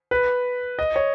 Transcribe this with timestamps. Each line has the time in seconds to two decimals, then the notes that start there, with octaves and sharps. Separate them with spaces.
0.11 B4
0.79 D#5
0.96 C#5